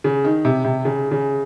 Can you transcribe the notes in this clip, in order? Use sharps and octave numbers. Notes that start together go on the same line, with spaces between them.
C#3
D#3
C3
C3
C#3
C#3